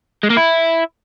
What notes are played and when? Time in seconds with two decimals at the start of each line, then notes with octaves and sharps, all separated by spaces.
0.23 G#3
0.30 A#3
0.37 E4